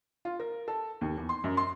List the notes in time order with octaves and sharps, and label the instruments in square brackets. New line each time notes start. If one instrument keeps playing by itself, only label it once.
[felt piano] F4
A#4
A4
D#2
E2
C6
F#2
C6